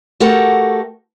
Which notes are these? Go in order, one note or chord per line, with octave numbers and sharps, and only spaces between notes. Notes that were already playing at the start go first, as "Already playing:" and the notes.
A3 F#4 G4 A4 A#4 F#5